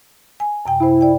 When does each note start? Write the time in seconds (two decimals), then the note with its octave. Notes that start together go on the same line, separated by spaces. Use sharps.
0.40 G#5
0.66 F#2 C3 G5
0.80 C3 E4 C5
1.01 D5 G5